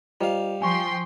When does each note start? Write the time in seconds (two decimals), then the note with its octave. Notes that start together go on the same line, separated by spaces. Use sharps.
0.21 G3 F4 C5 D#5 F5
0.62 F3 G5 G#5 C6 C#6